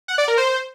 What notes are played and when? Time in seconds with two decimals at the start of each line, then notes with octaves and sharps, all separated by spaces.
0.08 F#5
0.18 D5
0.28 A#4
0.38 C5